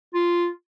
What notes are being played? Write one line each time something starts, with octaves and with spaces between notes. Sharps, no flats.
F4